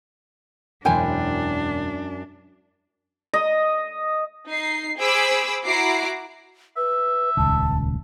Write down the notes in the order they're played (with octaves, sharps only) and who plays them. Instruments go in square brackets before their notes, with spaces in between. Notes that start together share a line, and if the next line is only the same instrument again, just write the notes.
[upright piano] E1 G6 [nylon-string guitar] F#2 E4 [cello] D4 [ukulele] C5 G5 G#5
[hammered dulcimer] D#5
[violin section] D#4 C7
G#4 C5 B5 D6 E6
E4 F#4 A#5 D6 C7
[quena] B4 [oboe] E5
[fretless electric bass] D#1 C#2 [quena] A5